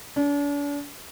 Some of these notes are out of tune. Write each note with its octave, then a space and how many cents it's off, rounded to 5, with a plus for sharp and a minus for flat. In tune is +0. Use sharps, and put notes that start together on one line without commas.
D4 -40